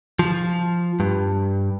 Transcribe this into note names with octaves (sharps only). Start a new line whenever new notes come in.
F3
G2